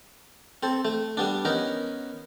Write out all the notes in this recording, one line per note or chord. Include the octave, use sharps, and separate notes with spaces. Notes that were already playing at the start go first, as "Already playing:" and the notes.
C4 A4
A3
G3 B3 D4
B3 C#4 D#4 A#4